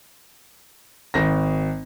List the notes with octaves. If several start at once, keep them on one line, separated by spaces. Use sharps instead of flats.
G#1 A#6